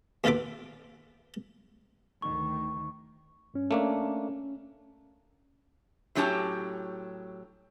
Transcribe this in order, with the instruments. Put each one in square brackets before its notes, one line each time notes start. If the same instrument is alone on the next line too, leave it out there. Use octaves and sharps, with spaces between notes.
[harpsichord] D#2 B2 F4 A4 B4 D6
[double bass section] D2 D#3 [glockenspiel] C#6
[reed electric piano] G2 C#4
[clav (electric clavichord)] A3 A#3 D4 [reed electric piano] C#4
[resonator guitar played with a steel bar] A2 F#3 C#4 G4 A5